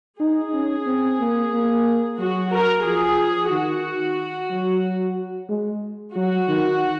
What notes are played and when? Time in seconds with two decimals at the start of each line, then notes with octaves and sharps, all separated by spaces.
0.20 D#4 G#4
0.53 C#4
0.86 C4
1.19 A#3
1.53 A#3
2.19 F#3 F#4
2.52 A#4
2.84 F3 G#4
3.50 D#3 F#4
4.50 F#3
5.49 G#3
6.15 F#3 F#4
6.48 D#3